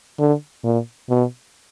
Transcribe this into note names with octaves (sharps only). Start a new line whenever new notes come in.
D3
A#2
B2